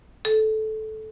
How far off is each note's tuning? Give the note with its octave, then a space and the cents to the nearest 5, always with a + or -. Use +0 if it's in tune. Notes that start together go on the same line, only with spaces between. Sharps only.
A4 -15